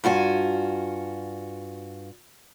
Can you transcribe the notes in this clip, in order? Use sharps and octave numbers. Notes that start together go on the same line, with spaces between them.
G2 F4 F#4 G#5